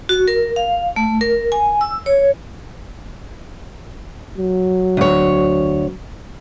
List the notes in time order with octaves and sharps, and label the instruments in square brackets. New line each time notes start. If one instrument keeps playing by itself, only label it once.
[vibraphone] F#4
A#4
F5
A3
A#4
G#5
E6
C#5
[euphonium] F#3
[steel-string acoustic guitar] D2 C#5